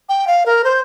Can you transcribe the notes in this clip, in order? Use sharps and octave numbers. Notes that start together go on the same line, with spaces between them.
G5
F5
A#4
C5